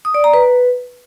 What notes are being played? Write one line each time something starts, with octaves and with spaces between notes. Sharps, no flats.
D#6
D5
A#5
B4